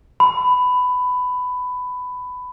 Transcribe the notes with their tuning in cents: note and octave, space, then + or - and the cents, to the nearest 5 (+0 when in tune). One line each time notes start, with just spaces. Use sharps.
B5 +15